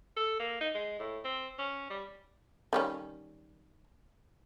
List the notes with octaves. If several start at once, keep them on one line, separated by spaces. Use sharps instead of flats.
A4
A#3
D#4
G#3
A2
C4
C#4
G3
D#3 G3 C#4